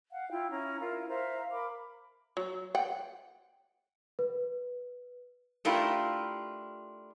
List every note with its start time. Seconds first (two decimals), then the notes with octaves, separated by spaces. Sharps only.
0.12 F5 F#5
0.29 E4 F4 G5
0.51 C#4 E4 A#5 C#6
0.80 E4 F4 A#4 F5
1.08 C5 E5 F5 A#5
1.51 A#4 B5 D6
2.37 F#3
2.75 F#5 G5
4.19 B4
5.65 A3 D4 E4 F4 G4 A#4